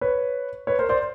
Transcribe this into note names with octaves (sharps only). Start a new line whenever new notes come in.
B4 C#5
B4 C#5
A#4 C5
C5 D5